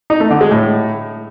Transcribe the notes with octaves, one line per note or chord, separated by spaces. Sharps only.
D#4
A3
D3
G#3
A2